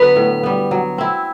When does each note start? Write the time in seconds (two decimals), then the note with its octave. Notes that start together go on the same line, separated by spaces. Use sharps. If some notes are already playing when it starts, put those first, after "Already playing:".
Already playing: D3 F#3 B3 B4
0.16 A2
0.43 G3 B3
0.71 F#3
0.98 C4 E4